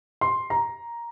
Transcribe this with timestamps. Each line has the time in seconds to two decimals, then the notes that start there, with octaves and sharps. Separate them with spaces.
0.21 C6
0.50 A#5